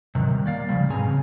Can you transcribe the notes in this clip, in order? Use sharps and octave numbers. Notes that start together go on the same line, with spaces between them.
C3 D#3 F#3
G3
A#3 D5 F5
C#3 F3 G3
G#2 B2 C4 G#4 G#5 A#5
C#3